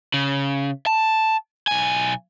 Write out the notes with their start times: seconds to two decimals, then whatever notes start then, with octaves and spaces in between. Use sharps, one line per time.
0.14 C#3
0.86 A5
1.67 B1 G#5